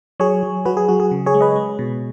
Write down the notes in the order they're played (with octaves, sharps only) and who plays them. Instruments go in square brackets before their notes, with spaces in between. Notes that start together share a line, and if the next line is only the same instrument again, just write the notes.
[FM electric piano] F#3 G#4 C#5
F#3
F#3 F#4 B4
G#4
F#3 F#4
G#4
C#3
G#4 C#5
G#3
B4 D#5
G#3
B2